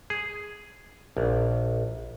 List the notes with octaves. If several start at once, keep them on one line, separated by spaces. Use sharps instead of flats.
G#4
A#1